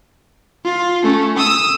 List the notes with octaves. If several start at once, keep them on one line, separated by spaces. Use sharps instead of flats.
F4
A3 C#4
D#6 E6